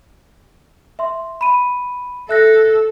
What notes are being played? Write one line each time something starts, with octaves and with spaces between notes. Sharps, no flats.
E5 C6
B5 D#7
A4 E5 F#6 A#6